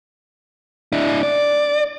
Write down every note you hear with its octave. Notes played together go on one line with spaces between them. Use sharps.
D4 E4
D5